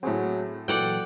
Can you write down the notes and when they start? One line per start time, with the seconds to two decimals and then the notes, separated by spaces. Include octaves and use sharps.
0.03 A2 F#3 C4 F#4 G#4
0.68 A#2 E3 F#3 A4 D5 F#5 G5